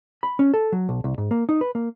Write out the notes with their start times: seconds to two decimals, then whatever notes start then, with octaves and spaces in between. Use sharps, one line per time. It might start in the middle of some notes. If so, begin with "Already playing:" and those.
0.23 B5
0.39 C#4
0.54 A4
0.72 F#3
0.89 B1
1.04 C2
1.18 G#2
1.31 A#3
1.49 D#4
1.61 B4
1.75 A#3